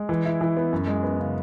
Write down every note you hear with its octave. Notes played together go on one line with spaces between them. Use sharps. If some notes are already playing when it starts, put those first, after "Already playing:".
Already playing: G#3
E3
E4
E3
B3
F#2
G#3
B3
C#3